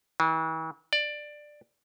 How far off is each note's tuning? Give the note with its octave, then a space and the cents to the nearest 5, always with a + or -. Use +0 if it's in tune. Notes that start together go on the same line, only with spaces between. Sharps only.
E3 -40
D5 +15